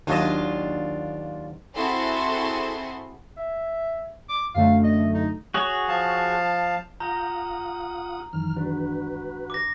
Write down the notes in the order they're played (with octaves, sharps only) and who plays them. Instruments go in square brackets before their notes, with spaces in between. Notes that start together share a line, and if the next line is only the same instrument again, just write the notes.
[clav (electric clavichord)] D#2 F#3 D#5 [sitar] D4 F4
[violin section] C4 E4 F#4 G#4 A4 C6
[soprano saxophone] E5
D6
[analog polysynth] F#2 D3 A3 [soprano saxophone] F5
[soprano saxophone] D#5
D#4
[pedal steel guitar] F#4 G#4 C#5
[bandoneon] F3 F5 A5
[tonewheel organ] F4 F#5 D#6 [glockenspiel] A#5 [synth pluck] G6 A#6
[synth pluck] F#2 D#3 E3 [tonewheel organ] F6
[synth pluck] G#3 D4 [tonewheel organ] F#4 B4
[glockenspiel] D6 A#6